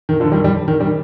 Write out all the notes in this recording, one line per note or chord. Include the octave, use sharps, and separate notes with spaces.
D#3
D3 F3
D#3 G3
D#3 G3
D#3
D#3 G3